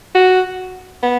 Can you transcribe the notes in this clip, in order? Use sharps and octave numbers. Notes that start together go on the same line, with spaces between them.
F#4
B3